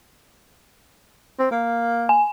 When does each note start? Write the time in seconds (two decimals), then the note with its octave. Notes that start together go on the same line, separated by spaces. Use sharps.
1.39 C4
1.51 A#3
2.09 G#5